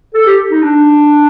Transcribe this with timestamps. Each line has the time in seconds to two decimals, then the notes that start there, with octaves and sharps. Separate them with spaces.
0.14 A4
0.26 G4
0.51 D#4
0.62 D4